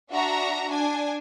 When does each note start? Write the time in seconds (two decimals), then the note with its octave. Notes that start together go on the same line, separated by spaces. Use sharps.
0.10 D4 F#4 E5 A#5
0.68 D4 G#5